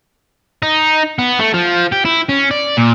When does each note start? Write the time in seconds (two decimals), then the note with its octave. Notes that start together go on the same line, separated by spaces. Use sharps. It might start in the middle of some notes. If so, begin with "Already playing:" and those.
0.63 D#4
1.19 B3
1.40 A3
1.54 F3
1.92 G4
2.05 E4
2.29 C#4
2.51 D5
2.77 A#2